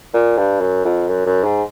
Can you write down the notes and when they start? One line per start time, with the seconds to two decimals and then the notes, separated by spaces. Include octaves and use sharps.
0.14 A#2
0.38 G2
0.61 F#2
0.85 F2
1.08 F#2
1.27 F#2
1.44 G#2